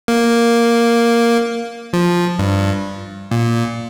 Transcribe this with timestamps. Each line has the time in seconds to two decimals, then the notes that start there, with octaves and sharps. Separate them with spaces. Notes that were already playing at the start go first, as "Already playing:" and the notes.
0.08 A#3
1.93 F3
2.39 G2
3.31 A#2